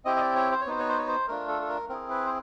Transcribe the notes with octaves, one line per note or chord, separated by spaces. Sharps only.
C4 E4 G4 D#5
D#5
D5
C#5
C5
C#5
B3 D#4 F#4 C5
C#5
C5
C#5
C5
A3 D4 F4 A#4
A4
A4
A#4
C4 E4 G#4 A#4
B4
C5